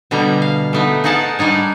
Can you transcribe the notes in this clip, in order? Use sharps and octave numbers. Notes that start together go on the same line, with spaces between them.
B2 D3 G3 B3 A#5
F5
A3 B3 D#4
D#4 G#4 A#4 F#5 A5
G3 D4 D#4 C#5